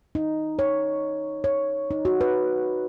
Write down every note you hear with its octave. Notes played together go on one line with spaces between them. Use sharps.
D#4
C#5
C#5
D#4
F#4
B4